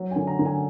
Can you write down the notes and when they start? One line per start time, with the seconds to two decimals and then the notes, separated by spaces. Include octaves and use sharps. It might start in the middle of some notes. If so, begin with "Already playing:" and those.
Already playing: F#3
0.11 G#5
0.16 D3
0.27 A#5
0.39 D3
0.45 G#5